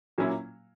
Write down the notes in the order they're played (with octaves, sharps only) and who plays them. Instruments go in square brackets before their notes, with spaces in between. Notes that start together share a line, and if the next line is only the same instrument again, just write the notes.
[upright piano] A#2 F#3 A#3 C#4 E4